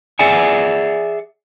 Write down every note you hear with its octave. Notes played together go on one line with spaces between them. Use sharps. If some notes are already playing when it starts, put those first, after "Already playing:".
G#4 D5 E5 F#5 G#5